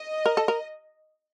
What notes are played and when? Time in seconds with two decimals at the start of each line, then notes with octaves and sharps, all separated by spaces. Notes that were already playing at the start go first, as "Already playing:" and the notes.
Already playing: D#5
0.26 A#4
0.37 A4
0.48 A#4